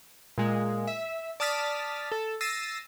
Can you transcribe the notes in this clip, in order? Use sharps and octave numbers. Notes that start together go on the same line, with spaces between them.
A#2 G#3
E5
D5 A5 D#6 F6 A6 B6
A4
E6 A6 A#6 C7 D#7